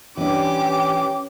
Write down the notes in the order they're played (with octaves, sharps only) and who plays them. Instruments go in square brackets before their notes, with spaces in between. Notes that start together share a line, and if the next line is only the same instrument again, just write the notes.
[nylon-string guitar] E3 D4 [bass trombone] C#4 [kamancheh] G4 D6